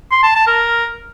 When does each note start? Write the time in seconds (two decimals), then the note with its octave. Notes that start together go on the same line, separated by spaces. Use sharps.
0.11 C6
0.23 A5
0.35 A5
0.47 A#4